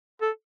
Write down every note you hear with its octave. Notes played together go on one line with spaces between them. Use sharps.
A4